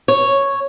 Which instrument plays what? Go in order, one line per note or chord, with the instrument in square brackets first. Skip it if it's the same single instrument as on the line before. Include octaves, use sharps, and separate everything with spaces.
[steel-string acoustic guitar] C#5